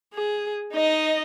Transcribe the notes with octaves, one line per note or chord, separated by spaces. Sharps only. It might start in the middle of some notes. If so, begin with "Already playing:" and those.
G#4
D#4 D#5